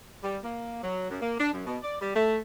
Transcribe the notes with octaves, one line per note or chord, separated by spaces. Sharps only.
G3
A#3
F#3
F#2
A#3
D4
F#2
B2
D5
G3
A3